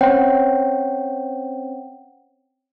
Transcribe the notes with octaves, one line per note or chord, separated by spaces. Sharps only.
C4 C#4 C5 C#5 F#5 G5